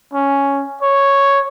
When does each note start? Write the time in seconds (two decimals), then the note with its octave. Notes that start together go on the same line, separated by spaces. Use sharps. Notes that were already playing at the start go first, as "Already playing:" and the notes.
0.14 C#4
0.83 C#5